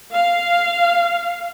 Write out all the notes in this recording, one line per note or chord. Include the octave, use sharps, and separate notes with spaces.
F5